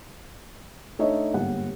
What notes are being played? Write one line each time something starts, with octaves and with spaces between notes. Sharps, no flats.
A3 D4 D#4 C#5 D#5 E5
G1 G#2 A#3 G4 F#5